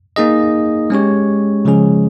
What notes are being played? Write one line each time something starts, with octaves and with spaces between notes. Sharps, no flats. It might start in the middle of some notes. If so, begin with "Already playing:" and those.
A#3 D#4 G#4 D#5
G#3 C#4 G4 C#5
C#3 F3 G#3 C#4 G#4